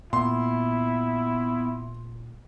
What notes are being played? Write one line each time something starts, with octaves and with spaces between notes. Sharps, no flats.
A#2 B3 E4 C6